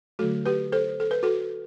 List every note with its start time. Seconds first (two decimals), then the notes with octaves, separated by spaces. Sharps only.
0.19 D3 F#3 A3 F#4 A4
0.46 G4 B4
0.72 A4 C5
1.00 A4
1.11 B4
1.23 F#4 A4